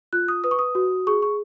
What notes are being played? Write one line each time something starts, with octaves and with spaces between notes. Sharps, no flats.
F4 F#6
D#6
B4 D#6
C#6
D#6
F#4
G#4 C#6
C#6